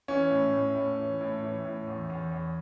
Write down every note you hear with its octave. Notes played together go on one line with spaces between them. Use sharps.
E3 C#4
A2
A2
A2
E3
A2
E3
A2
E2
E2
E2